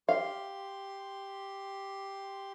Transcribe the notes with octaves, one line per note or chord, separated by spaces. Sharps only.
G4 F5 C6